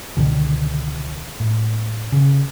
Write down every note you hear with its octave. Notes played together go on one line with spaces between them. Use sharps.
C#2 B2 D3 D#3
A2
C#3